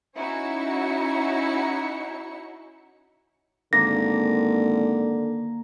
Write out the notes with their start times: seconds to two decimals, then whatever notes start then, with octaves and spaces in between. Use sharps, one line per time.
0.16 C#4 D#4 E4 F#4 C#5 C#7
3.73 G#1 D3 A#3 A#6